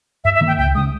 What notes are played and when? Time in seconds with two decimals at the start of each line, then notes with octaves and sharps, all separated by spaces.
0.24 G2 E5
0.35 E5
0.41 D#3 A#3
0.47 G5
0.58 C#2 G5
0.75 C#3 G#3 D#6